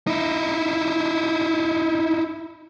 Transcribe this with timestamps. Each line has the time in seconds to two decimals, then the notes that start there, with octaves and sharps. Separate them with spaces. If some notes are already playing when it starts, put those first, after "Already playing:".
0.07 D#4 E4